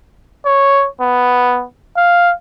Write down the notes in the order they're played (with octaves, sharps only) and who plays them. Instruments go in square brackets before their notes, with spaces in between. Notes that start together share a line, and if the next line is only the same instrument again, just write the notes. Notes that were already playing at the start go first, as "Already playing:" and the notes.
[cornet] C#5
B3
F5